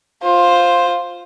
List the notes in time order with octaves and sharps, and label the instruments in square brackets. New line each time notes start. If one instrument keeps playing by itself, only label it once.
[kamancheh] F4 C5